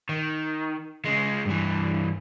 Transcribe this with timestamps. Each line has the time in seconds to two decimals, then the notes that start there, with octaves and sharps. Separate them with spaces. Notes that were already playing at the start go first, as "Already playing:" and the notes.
0.09 D#3
1.05 C#3 G#3
1.45 G2 E3